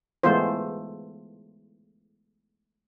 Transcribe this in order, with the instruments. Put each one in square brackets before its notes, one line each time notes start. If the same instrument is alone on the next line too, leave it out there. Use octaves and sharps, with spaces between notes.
[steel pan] E3 G#3 A3 B3 F4 C5